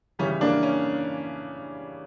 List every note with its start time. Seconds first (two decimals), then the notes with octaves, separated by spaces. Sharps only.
0.19 C#3 E3 G3 C#4
0.41 A#3 D4
0.63 C#4